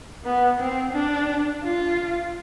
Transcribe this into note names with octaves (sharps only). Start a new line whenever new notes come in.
B3
C4
D4
F4